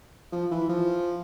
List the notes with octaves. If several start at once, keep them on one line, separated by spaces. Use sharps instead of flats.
F3
E3
F3